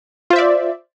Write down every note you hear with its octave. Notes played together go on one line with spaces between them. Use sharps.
F4 C5 D5 E5